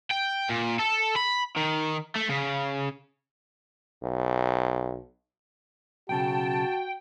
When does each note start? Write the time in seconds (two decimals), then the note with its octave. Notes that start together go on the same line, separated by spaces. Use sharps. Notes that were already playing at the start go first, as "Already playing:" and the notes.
0.11 G5
0.50 A#2
0.80 A4
1.16 B5
1.57 D#3
2.16 A3
2.30 C#3
4.03 B1
6.09 B1 C#3 F#4 G5 A5